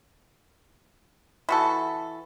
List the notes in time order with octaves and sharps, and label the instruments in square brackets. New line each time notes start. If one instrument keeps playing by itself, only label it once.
[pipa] E3 F#4 A4